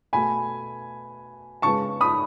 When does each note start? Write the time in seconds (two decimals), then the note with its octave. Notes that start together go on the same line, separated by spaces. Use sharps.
0.13 B2 A3 G#5 B5
1.62 C#3 G#3 B3 A5 C#6
2.01 B5 D#6